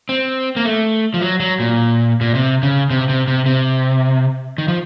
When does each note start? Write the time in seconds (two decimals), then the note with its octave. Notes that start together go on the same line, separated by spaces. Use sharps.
0.09 C4
0.57 A#3
0.65 A3
1.14 F3
1.22 F#3
1.40 F#3
1.60 A#2
2.21 A#2
2.35 C3
2.63 C#3
2.90 C3
3.09 C3
3.28 C3
3.46 C3
4.58 D#3
4.68 F3